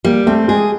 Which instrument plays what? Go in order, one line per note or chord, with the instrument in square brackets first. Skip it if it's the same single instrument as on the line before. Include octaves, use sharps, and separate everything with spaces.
[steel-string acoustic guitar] G3 [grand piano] A#3
[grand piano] A3 [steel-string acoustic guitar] C4
[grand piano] G#3 [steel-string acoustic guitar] G#4